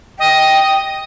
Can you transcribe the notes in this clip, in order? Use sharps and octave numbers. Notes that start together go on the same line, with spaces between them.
D#5 G5